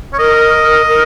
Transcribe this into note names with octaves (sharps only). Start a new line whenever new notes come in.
C#5
A#4 D#5
A#4